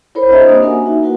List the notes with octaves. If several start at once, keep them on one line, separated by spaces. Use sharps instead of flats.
E4 A4 A#4 C5 C#5 B5
C4 D4 C5 D#5 E5 A#5
A#3 D4 G4 D#5 D#6
A#3 C#4 F#4 A#4 F#5 G#5
D#4 F#4 E5
A#3 E4 F#4 A#4 B4 F#5